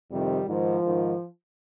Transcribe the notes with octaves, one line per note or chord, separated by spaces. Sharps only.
F2 C3 D#3 G3
G#2 D#3 F3
G#2 D#3